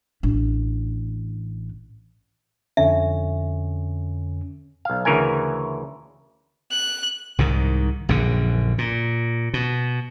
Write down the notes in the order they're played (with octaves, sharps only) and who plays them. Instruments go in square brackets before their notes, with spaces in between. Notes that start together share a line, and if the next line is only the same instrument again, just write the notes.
[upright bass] A1 D4
[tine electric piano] F2 D3 C#4 [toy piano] E5
[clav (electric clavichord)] B1 F5
D2 C#3 E3 A#4 G#5
[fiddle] F#6
[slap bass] C2 G#2 D#3
A#1 F#2 D3
A#2
B2